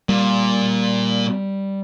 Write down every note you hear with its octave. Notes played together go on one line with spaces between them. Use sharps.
A#2 G3